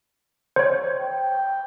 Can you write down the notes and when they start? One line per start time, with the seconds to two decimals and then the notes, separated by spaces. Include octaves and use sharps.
0.56 C5 C#5
0.99 G5